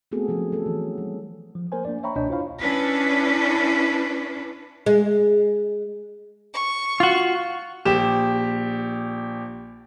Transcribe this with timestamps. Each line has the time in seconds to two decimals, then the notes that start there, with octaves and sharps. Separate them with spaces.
0.12 A3 B3 C4 F#4 G#4 A4
0.28 F3 F#3 B3 C#4
0.52 F#3 A4
0.66 E3
0.98 G3
1.55 F3
1.72 A#3 A#4 C5 G#5
1.85 A#3 D4 D5
2.03 C#5 E5 G5 A#5 B5 C#6
2.16 C#2 B2 D4 C#5 D#5 G6
2.29 E4 F4 C5 C#5 F5 B5
2.59 C#4 D4 E4 B4
4.86 G#3
6.54 C#6
7.00 F4 F#4
7.85 A#1 G4 E7